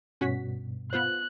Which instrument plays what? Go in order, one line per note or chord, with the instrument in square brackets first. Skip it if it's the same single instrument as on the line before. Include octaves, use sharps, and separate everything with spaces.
[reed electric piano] G2 B2 [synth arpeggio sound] C#4 F#4 B6
[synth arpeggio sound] B3 F4 C5 [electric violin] F#6